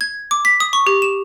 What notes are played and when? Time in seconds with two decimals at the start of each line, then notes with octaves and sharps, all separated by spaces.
0.01 G#6
0.31 D6
0.45 B6
0.60 D#6
0.73 C#6
0.87 G4
1.02 E7